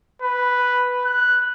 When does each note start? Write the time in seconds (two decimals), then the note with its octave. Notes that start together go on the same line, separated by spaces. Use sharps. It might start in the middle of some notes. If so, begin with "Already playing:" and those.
0.22 B4
1.05 F#6